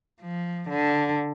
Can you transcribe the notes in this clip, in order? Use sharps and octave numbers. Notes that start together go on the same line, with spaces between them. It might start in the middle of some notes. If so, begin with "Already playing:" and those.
F3
D3